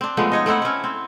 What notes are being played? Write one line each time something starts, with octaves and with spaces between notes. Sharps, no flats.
C4 D4
F3 G#3 A3 B3
D#4 C#5 D#5
A3 C4 E4 F#5
C#4 E4
C4